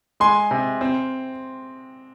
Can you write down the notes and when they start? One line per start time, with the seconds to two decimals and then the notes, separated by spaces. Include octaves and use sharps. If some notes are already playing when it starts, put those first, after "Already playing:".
0.20 G#3 G#5 C6
0.51 C3
0.81 C4